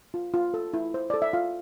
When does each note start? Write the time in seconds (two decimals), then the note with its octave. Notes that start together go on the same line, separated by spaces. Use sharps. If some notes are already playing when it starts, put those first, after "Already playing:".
0.14 F4
0.34 F4
0.54 A4
0.74 E4
0.94 C5
1.10 A4 D5
1.22 E5
1.33 F4 F5